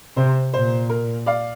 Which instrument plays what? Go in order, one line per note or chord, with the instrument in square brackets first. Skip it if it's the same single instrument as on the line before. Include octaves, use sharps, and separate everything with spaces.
[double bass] C3 [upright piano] C5
[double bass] A#2 [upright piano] C5
[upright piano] A#4
D5 F5